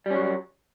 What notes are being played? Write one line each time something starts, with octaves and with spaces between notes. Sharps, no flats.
F#3 G3 C#4